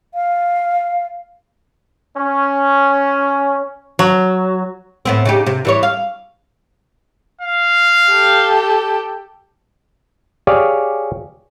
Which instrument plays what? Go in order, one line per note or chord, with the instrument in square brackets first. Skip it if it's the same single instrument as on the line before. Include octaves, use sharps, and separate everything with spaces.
[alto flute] F5
[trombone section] C#4
[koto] F#3
[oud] A2 B3 C4
C#3 D#4 G4
C3
E3 G3 C#5
F5
[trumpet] F5
[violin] G4 A4
[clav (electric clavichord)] G4 G#4 C#5 D5 F5